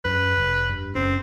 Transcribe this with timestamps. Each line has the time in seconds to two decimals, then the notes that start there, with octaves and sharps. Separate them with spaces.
0.05 F#2 B4
0.38 F1
0.70 G2
0.95 F#1 C4 C#4